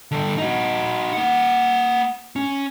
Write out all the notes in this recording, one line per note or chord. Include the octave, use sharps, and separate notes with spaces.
D3 G3
D#4 F#4
A#3 F#5
C#4